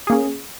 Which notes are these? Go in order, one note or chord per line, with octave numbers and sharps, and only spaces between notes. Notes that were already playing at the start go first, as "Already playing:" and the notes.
A#3 C#4 G#4